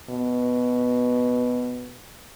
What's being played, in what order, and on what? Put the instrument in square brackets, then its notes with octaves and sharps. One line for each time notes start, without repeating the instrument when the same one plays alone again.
[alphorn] B2